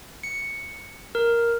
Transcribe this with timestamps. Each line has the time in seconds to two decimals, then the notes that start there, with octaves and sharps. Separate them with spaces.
0.23 C#7
1.15 A#4